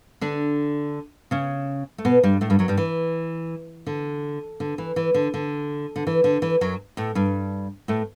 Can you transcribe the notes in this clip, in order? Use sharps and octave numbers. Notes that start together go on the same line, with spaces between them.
D3 D4
C#3 C#4
A3
B2 B3
G2 G3
A2 A3
G2 G3
F#2 F#3
G2 G3
E3
D3
D3
E3
E3
D3
D3
D3
E3
D3
E3
F#2 F#3
A2 A3
G2 G3
A2 A3